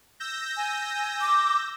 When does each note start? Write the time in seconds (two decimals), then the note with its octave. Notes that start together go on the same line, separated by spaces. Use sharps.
0.20 E6 G6 A#6
0.57 G#5
1.21 D6